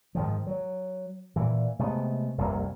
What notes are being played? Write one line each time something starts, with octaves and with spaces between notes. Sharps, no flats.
G#2 D#3 F3
F#3
A#2 E3
C3 G#3 A3 B3
F1 C2 F#2 A#3